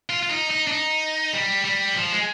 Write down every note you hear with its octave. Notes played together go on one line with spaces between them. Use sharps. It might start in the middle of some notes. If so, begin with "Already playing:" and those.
F4
F4
D#4
D#4
D4
D#4
G3
G3
F3
G#3